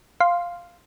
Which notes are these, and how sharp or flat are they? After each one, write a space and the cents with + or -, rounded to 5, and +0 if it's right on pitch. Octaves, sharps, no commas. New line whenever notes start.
F5 +0 C6 +0